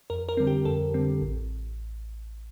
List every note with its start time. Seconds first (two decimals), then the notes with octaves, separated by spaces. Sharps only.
0.10 F2 A#4
0.29 A#4
0.37 D3 G3 C4
0.47 G4
0.65 F2 A4
0.94 D3 G3 C4
1.21 A1